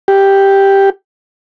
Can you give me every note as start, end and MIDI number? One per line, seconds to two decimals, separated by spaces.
0.08 0.90 67